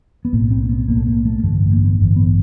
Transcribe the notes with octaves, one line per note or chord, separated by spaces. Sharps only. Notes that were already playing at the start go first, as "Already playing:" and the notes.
B3
B1 A2 A#3
C4
B3
B1 A2 A#3
A3
A#3
A3
A1 G2 D3 A3
A#3
B3
A1 G2 D3
B3